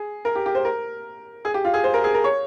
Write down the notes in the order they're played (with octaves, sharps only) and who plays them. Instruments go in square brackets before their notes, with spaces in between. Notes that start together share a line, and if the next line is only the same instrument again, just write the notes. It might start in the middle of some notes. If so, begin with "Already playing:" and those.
Already playing: [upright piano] G#4
A#4
G4
G4
C5
A#4
G#4
G4
F4
G#4
C5
A#4
G#4
A#4
C#5